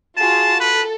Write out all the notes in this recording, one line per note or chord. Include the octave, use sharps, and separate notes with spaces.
F4 F#4 G#4 A5
A4 B4